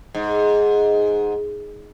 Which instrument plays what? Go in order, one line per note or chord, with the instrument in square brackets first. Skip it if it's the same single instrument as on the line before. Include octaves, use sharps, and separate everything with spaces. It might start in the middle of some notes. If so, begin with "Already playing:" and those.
[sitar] G#2